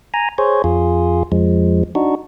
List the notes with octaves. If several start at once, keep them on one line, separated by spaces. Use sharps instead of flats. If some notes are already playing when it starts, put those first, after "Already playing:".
G#5 A#5
G#4 C5 C#5
F2 F4 G#4
F2 F3 G#3
D4 D#4 F#4